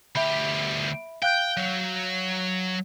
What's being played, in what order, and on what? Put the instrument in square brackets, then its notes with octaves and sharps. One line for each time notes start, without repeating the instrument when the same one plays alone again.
[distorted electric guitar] D2 G4 [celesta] E5 B5
[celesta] F5 F#6 G6 [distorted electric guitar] G5
[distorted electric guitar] F#3